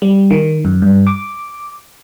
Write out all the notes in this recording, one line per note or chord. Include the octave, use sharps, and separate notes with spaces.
G3
D#3
F#2
G2
D6